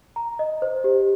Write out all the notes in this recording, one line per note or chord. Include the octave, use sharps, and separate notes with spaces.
A#5
D#5
C5
G4